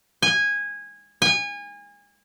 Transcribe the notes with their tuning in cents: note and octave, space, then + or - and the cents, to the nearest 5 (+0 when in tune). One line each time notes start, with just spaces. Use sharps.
G#5 -15
G#5 -30